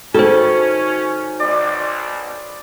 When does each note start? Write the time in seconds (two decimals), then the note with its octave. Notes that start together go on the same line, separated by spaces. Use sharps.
0.14 D#3 C#4 F#4 A4 C5
1.40 B1 D5 D#5